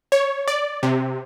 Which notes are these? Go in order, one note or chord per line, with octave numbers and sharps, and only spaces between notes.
C#5
D5
C3